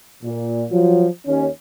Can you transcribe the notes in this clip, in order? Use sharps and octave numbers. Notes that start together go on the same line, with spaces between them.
A#2
F3 F#3
D#2 C#4